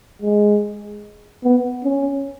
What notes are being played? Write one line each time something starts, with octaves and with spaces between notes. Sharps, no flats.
G#3
B3
C#4